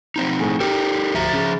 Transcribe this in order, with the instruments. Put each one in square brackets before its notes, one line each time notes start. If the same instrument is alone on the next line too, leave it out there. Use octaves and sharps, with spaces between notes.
[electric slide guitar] F3 C4 D#4
[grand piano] A2 G#4
[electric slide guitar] D#4 A4 A#4 [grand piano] G4
[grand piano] D1 [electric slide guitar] F3 E5 A#5
[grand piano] C#3 A6